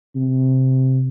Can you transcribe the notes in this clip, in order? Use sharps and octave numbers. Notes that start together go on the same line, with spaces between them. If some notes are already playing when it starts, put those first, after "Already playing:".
C3